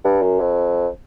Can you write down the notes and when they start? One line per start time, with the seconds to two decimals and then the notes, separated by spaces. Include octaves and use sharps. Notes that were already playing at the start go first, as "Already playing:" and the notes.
0.05 G2
0.22 F#2
0.40 F2